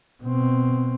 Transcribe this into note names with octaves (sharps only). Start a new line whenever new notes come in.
B2 C4